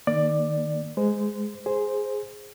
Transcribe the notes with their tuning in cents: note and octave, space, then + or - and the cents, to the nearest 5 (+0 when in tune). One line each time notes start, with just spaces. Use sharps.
D#3 -10 A#3 +5 D5 +10
G#3 +0 C5 -25
G#4 +0 C5 +0